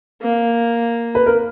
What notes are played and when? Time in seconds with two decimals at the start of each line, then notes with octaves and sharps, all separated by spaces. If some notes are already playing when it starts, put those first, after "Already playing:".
0.22 A#3
1.15 B4
1.26 A#4